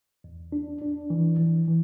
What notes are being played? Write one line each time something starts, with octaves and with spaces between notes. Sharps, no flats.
E2
D4
D4
E3
E3
E3